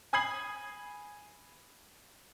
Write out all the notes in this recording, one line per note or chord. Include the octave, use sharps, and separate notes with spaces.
G#5 B5 D#6 G#6 C7 F#7